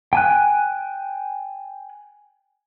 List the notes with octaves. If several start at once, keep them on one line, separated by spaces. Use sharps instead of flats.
G5 G#5 F#6